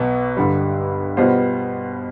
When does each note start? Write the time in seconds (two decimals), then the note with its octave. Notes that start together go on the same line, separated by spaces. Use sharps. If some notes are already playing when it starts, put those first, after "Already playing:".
Already playing: B1 B2 B3
0.37 G2 D3 G3
1.17 B2 G3 B3 F4 C5